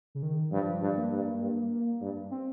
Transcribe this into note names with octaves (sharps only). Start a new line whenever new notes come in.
C#3
D#3
G2 F3
G2
A#3
G2
G2
G2
C4